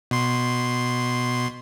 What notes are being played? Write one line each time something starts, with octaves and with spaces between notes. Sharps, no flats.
B2 C6